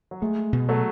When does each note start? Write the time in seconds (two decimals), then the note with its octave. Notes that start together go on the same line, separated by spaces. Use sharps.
0.11 F#3
0.22 G#3 A3
0.53 B2
0.69 F#3 A3